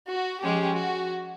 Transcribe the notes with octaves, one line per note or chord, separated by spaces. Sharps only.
F#4
F3 G#3 C#4 G4
F#4